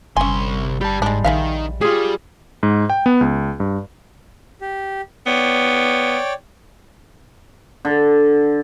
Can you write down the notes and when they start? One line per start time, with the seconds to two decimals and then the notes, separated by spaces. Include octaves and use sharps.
0.17 G1 C2 C#4 G#5 C6
0.81 G3 G4 A5
1.02 G#2 G#3 D4
1.24 A#1 D#3 G#3 E5 F5
1.81 G3 F4 G#4
2.63 G#2
2.90 G5
3.06 B3
3.21 C#2
3.60 G2
4.61 G4
5.27 B3 C#5 D5 G5
7.85 D3